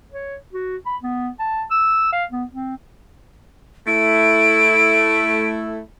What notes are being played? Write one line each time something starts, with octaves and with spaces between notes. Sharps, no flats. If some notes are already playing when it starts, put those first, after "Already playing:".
C#5
F#4
B5
B3
A5
E6
F5
B3
C4
A3 E4 D7